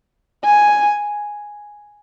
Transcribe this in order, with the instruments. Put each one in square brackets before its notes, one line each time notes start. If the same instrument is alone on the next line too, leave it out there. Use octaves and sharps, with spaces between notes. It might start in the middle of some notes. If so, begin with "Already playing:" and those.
[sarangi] G#5